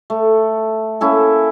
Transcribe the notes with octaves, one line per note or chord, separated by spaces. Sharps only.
A3
A#3 C#4 E4 A4